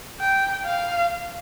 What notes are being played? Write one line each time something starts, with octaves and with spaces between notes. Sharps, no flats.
G5
F5